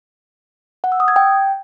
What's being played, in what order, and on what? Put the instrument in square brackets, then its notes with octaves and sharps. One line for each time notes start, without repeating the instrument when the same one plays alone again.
[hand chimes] F#5
E6
D#6
G#6
G5